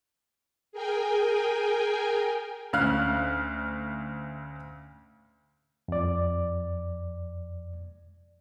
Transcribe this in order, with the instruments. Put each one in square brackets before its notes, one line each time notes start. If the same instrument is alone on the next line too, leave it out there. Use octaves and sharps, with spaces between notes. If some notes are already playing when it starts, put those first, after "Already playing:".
[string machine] G#4 A#4 G5 G#5
[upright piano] D2 C#4 F5 F6 F#6
[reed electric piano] F2 D5